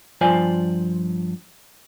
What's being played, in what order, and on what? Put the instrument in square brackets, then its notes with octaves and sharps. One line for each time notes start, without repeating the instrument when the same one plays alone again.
[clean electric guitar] G2 F3 F4 C5 D5 G#5